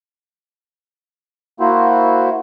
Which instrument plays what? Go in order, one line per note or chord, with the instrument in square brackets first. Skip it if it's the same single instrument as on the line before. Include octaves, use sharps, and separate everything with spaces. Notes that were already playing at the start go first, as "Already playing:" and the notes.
[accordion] A#3 E4 F#4 C5